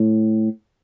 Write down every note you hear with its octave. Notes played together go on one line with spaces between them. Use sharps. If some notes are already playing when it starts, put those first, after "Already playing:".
Already playing: A2